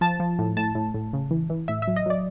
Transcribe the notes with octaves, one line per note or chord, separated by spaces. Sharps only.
F3 A5
F3
A2
A2 A5
A2
A2
C#3
E3
E3
A2 E5
E5
F#3
D#5
F#3 D5